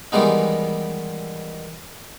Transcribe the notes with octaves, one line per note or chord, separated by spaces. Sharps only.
D#3 E3 G3 G#3 B3 D#4